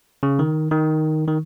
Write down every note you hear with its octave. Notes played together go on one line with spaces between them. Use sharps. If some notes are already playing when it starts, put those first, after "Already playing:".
C#3
D#3
D#3
D#3